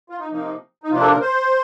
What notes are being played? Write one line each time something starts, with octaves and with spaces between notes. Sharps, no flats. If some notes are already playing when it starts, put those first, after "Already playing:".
F4
D#4
C3 F3 A#3 D#4
D#4
C3 F3 A#3 D4 F4
A4
A#4
C5